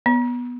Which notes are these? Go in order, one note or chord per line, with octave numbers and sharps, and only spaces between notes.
B3